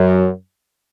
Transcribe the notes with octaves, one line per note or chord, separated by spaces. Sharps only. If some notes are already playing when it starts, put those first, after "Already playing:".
Already playing: F#2 F#3